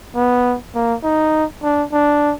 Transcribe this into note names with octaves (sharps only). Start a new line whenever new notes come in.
B3
A#3
D#4
D4
D4